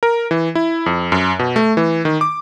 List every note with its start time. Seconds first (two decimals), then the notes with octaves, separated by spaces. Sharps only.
0.03 A#4
0.31 E3
0.55 E4
0.86 F2
1.12 F#2
1.39 B2
1.56 A3
1.77 E3
2.05 D#3
2.21 D6